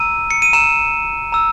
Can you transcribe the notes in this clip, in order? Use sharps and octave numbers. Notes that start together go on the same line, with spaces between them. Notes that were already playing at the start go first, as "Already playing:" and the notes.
Already playing: A#5 E6 D#7
C#7
D#7
A#5 E6 E7
A#5 E6